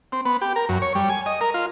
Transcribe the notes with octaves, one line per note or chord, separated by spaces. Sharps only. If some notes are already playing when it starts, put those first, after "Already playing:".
C4
B3
G4
A#4
F#2
C#5
G3
G#5
D#5
A#4
F4